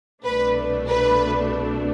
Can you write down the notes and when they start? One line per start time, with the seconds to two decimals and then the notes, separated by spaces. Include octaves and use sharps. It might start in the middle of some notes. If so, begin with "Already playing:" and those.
0.24 C2 B2 A3 D4 B4
0.88 B4